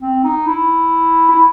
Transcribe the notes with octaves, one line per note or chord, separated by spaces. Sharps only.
C4
D#4
E4
E4